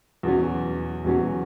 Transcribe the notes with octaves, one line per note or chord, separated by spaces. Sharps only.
E2 B2 F#3 C#4
E2 B2 F#3 C#4